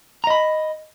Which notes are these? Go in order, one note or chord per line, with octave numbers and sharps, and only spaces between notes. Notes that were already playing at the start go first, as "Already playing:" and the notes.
D#5 A#5 B5